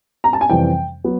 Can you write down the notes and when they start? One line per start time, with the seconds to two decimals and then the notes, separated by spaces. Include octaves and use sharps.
0.24 A#5
0.33 A5
0.41 G#5
0.50 F2 C3 E3 G3 C4 G5
1.04 F#3 B3